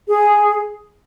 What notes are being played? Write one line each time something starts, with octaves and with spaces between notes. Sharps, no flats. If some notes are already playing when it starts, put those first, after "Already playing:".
G#4